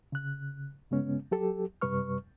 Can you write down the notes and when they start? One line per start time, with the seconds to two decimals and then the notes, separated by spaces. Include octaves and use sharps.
0.12 C#3 F#6
0.91 G2 C#3 G#3 B3 C#4
1.31 F#3 G4 A4
1.81 F#2 C3 G3 B4 C#6 F6